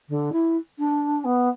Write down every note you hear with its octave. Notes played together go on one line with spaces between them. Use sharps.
D3
E4
D4
B3